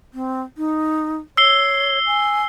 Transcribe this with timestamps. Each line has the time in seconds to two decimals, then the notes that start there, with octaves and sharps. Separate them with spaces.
0.14 C4
0.58 D#4
1.37 C#5 E6 C7 G7
2.07 G#5